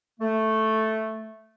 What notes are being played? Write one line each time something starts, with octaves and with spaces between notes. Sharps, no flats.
A3